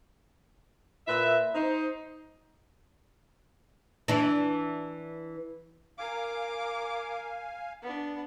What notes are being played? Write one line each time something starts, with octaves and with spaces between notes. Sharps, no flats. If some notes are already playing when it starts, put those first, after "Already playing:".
A#2 B4 E5
D#4 C5
E3 D4
A#4 F5 G#5 D6
B3 D4